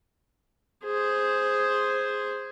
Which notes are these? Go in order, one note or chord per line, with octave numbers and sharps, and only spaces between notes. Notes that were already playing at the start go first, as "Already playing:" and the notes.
G#4 C5